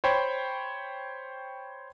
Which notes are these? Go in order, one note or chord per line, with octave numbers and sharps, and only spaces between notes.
C5 C#5 G5 B5